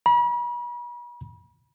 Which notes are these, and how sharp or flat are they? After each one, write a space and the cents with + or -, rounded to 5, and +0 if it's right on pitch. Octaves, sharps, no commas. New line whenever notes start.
B5 -40